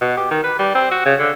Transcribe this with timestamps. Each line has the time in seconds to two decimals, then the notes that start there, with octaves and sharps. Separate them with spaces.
0.01 B2
0.17 G4
0.31 D#3
0.43 B4
0.59 G3
0.75 C4
0.91 F#4
1.06 C#3
1.19 D3